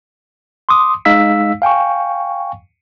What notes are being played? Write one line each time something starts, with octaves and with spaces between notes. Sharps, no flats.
C6 D6 D#6
G#3 D#4 F5 E6 B6
F5 G5 G#5 C#6